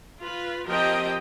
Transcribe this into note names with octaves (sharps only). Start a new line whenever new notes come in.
F4 B4
F3 C4 G4 A#4 D#5 G5